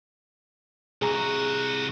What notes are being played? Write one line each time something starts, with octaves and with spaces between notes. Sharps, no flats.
C2 F#4 G#4 A#5